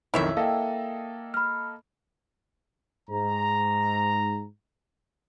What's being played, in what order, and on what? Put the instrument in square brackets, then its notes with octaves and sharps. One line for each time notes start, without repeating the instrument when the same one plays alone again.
[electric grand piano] B1 F2 D#3 [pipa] E4 C#5 E5
[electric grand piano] A#3 A4 D#5 [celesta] F5 G5
[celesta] B5 F6
[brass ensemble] G#2 A#5